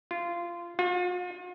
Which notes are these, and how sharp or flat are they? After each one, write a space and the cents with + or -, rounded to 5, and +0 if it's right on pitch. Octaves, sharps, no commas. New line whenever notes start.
F4 -20
F4 +40